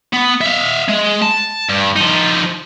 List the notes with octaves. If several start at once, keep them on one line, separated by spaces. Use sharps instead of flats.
B3
E5 F5
G#3
A5
G2
F3 D#4